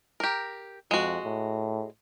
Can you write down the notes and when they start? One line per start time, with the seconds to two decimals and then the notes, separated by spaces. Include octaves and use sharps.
0.20 G4 A#4
0.91 F2 G#3 F#4
1.24 A2